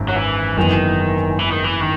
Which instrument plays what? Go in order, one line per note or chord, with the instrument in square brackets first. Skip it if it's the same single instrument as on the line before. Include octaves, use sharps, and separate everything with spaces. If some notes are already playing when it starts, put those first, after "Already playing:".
Already playing: [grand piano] G#1 F#2
[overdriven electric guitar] F#3
E3
[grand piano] F#1 F#2 E3 B3 [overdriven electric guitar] D#3
[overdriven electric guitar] E3
D#3
E3
D#3